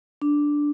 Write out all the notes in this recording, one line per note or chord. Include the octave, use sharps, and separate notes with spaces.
D4